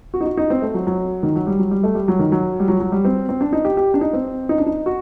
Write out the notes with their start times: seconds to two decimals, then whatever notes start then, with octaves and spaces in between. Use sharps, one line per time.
0.14 F#4
0.21 D#4
0.26 F#4
0.37 D#4
0.50 C4
0.62 A3
0.74 F#3
0.87 F#3
1.23 D#3
1.35 F#3
1.47 G3
1.59 F#3
1.71 G3
1.83 A3
1.95 G3
2.08 F#3
2.19 D#3
2.32 F#3
2.59 G3
2.68 F#3
2.80 F#3
2.92 G3
3.05 C4
3.29 C4
3.41 D4
3.53 D#4
3.65 G4
3.77 G4
3.94 D4
4.01 D#4
4.13 C4
4.49 D#4
4.58 D4
4.66 D#4
4.86 F#4